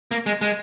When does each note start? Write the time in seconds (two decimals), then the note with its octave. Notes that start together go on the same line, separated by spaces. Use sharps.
0.11 A#3
0.26 G#3
0.41 G#3